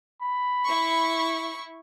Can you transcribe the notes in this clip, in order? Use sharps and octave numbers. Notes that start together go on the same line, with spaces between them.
B5
E4 C#6